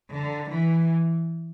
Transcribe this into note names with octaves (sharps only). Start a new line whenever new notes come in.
D3
E3